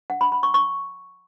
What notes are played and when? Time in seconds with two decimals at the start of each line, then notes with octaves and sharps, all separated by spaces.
0.10 F#5
0.21 B5
0.32 B5
0.43 C#6
0.54 C#6